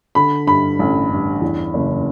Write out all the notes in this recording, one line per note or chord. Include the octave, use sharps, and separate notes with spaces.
D3 B5
G2 B5
A1
G2
E2
F#1